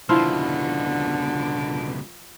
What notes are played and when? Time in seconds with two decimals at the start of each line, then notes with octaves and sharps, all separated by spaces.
0.09 C#2 B2 D3 F3 E4 F4